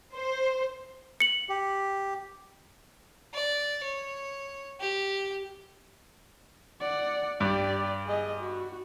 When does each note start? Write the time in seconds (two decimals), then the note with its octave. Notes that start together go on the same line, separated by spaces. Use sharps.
0.15 C5
1.20 C#7 F#7
1.49 G4
3.34 D5
3.84 C#5
4.80 G4
6.81 D5 F#5
7.40 G2 G4 D5
8.07 G#4 D#5
8.40 F#4